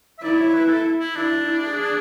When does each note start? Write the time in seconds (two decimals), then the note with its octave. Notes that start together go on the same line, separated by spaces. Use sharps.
0.18 E5
0.22 E4 D5
0.38 C#5
0.54 B4
0.65 B4
0.69 A4
1.00 E4
1.15 D4 E4
1.61 G#4